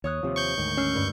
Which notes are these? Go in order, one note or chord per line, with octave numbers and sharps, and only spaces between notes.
D#2 C#5 D#6 F#6
D#2 C3 F3
C#6 G6
D2 G#2 D#3
C#4 E6 F6 C7
G2